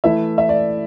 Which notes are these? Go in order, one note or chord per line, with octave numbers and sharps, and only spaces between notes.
E3 A3 E4 E5
E5
D5